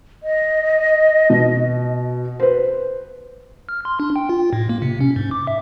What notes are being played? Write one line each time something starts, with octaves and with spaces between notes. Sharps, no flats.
D#5
B2
B4 C5
F6
C6
D4
G5
F4
A2
A#3
C3
C#4
G#2
D6
E5